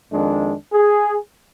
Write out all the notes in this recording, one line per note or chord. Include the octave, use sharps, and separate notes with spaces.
F2 D#3 G#3 D4
G#4